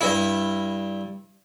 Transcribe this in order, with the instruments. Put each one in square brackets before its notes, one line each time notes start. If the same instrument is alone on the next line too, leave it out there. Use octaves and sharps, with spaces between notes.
[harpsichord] G2 E4